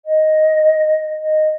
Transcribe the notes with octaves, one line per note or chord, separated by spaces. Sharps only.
D#5
D#5